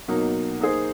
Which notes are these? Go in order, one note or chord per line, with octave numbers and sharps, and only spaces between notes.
B2 F#3 A#3 D#4
A#3 D#4 G#4 C5